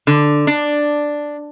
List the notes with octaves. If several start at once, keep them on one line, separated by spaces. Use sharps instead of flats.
D3
D4